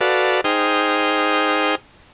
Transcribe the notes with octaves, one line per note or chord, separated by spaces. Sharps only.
F#4 A4 B4 D5 F5
D#4 G#4 C5 G5 D#6 F6